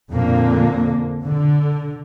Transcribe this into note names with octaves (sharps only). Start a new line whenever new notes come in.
F2 A#2 D3 A#3
D3